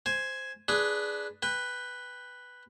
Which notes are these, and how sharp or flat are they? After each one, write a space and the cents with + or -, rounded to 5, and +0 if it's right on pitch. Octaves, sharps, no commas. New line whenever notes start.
C5 +0 G#5 +0
D4 -5 G#4 +5 B4 +0
B4 +0 G5 +25